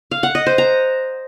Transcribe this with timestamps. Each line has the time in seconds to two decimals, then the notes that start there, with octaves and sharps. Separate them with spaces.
0.11 F5
0.23 F#5
0.35 D#5
0.46 C5
0.58 A#5